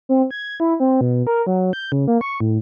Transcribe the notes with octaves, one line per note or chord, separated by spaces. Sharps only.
C4
G#6
E4
C4
B2
A#4
F#3
G6
C#3
A#3
C#6
A2